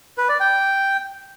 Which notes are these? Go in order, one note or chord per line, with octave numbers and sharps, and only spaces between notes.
B4
D5
G5